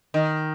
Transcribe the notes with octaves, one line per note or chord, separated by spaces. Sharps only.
D#3